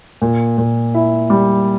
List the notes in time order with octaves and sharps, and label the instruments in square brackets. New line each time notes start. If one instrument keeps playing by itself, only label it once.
[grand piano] A#2
A#2
E4
G3